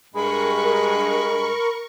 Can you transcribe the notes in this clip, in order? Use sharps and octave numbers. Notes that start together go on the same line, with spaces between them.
G2 G#3 A#4 B5 C#6